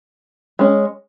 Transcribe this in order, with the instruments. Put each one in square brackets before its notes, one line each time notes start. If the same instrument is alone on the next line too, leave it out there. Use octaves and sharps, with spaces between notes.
[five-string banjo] G#3 C#4